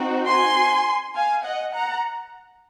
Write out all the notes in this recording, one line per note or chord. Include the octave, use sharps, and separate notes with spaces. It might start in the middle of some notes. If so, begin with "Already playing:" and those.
Already playing: C4 D#4 F#4
G#5 C6
F5 G#5
D#5 F#5
F#5 A#5